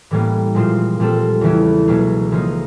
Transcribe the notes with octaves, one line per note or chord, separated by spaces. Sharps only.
A2 E3 G3 A#3 C#4
A#2 F3 G#3 C4 F4
A#2 G3 C4 F4 A4
E2 C#3 E3 A3 C#4
C#2 B2 F#3 A#3
C#3 F3 A#3 D#4